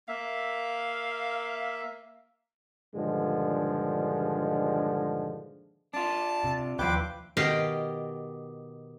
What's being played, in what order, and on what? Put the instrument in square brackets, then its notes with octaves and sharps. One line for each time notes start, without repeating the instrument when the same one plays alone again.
[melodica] A#3 E5 [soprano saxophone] F5
[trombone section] G2 A#2 D3 D#3 F3 G#3
[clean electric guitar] D4 F4 [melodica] A5
[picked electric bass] C3
[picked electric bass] D#2 [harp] F3 E4 G5 [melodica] B4 D6
[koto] B2 D#3 G4 D#5 F5 G5